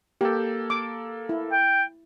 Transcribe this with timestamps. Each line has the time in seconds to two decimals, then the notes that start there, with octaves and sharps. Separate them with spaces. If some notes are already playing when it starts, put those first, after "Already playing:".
0.21 A#3 G4 A4
0.70 D6
1.29 E4
1.52 G5